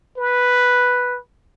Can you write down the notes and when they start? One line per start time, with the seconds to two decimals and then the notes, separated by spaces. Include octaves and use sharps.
0.17 B4